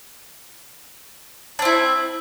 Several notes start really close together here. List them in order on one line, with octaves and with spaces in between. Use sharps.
D4 C4 E4